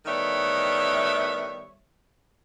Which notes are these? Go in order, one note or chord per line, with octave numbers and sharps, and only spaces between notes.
A2 D#3 G3 B3 C#5 E5